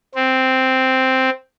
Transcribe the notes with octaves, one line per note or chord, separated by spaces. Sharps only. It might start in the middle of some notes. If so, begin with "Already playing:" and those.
C4